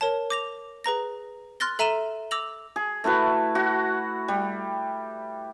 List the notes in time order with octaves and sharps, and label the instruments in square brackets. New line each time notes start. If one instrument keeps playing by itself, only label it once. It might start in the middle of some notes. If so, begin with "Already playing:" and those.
[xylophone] A#4 C#5 A5
D6 A#6 F7
G#4 B4 A#5 A#6
C6 F6 F#6 A6 A#6 G7
A4 E5 A#5 D#7 E7 G7
D6 E6 A#6 F7 F#7
[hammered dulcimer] G#4
A3 E4 F#4 B4
F#4 F#5
G3